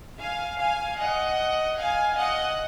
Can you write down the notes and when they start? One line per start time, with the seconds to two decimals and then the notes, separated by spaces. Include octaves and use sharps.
0.19 F5 G#5
0.59 F5 G#5
0.99 D#5 F#5
1.78 F5 G#5
2.18 D#5 F#5